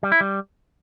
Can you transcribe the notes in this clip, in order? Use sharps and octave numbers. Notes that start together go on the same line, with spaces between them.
G3
E4
G3